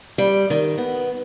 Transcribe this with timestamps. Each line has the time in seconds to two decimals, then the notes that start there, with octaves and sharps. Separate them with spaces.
0.18 G3
0.50 D#3
0.78 B3